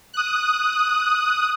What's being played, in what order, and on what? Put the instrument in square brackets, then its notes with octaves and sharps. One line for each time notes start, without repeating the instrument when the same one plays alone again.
[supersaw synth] D#6 F#6